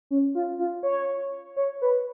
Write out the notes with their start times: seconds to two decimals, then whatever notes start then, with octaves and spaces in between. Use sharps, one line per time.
0.11 C#4
0.35 F4
0.59 F4
0.83 C#5
1.56 C#5
1.82 B4